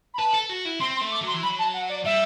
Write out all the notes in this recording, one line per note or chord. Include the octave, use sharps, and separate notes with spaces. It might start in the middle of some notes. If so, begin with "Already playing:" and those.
B5
B4 A5
A4
F#4
E4
C4 C6
C6
A3
D6
F#3
C6
E3
F#3 B5
A5
F#5
D5
G3 E5